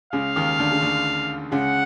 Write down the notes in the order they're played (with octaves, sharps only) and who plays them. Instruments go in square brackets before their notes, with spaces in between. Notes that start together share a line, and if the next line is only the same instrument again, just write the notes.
[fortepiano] C#2 C#3 [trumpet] F5
[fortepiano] D#2 D#3
D2 D3
C#3
D2 D3
[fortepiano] C#2 C#3 [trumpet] F#5